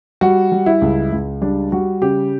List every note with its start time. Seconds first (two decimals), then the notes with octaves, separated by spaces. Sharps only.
0.21 G3 F#4
0.52 G3
0.66 E4
0.82 C#2
1.12 C#2
1.42 G3 D4
1.72 G3 F#4
2.02 C#3 G4